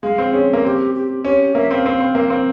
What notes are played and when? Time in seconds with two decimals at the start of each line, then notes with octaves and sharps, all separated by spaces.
0.03 G#3 F5
0.18 C4
0.33 C#4 G#4
0.53 A#3
0.64 C4 G4
0.95 G4
1.25 C#4 G4
1.55 A#3 E5
1.70 C4 F5
1.86 C4
2.00 C4
2.15 A#3
2.30 C4